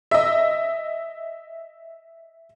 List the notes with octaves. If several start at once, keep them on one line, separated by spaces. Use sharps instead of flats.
D#5 E5